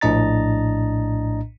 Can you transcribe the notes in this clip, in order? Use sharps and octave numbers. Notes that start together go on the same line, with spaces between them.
A#1 A2 D4 D#5 A#5 A6